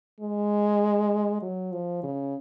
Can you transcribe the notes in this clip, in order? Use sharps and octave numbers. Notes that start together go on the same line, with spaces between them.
G#3
F#3
F3
C#3